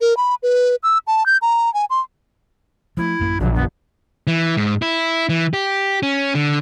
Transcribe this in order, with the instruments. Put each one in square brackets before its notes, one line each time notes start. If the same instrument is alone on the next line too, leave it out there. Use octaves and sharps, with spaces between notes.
[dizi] A#4
B5
B4
E6
A5
G6
A#5
G#5
C6
[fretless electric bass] F3 G#3 A3 [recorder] E4
[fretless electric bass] A1 F#2 A#3
[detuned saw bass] A#1 [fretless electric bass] B2 D3 F3 [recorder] F#3
[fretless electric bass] F#1 F2 D#3 [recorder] B3
[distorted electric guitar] E3
G#2
E4
E3
G4
C#4
D3